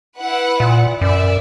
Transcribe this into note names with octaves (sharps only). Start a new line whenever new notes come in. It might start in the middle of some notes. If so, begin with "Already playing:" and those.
E4 B4 F#5
A#2
F#2 D5 E5